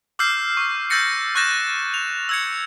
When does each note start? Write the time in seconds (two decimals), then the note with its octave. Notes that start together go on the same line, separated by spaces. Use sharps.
0.19 D6 E6 F6 G6 C7
0.57 C#6
0.90 E6 G6 A6 A#6 C#7
1.35 C#6 F#6 G6 A6 A#6 E7
1.94 F7
2.29 E6 G#6 C#7